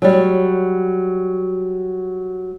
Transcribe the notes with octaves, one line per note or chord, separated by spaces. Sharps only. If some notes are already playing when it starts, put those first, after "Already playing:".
F#3 G3